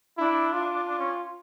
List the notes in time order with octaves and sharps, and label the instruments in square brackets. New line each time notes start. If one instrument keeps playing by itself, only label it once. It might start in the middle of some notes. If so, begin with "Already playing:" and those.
[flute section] D4 [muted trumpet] E4
[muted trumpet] F4
[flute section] D4
C#4